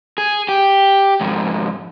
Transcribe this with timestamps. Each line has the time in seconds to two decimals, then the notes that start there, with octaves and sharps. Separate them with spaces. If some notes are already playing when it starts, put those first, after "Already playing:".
0.18 G#4
0.48 G4
1.21 F2 G#2